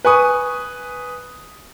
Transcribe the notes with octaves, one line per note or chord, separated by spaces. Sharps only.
B4 G#5 C#6 D#6